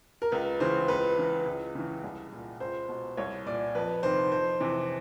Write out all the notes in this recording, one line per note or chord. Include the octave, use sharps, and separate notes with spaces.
A#4
C#2 B4
C#3 E3 C5
C#2 B4
C#3 E3
C#2
C#3 E3
C2
A#2
C#2 C5
B2
C2 C#5
A#2 D5
F2 B4
C3 D#3 C5
F2 C5
C3 E3